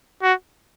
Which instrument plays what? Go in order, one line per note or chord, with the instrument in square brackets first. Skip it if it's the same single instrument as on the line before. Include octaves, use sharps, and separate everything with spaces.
[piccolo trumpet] F#4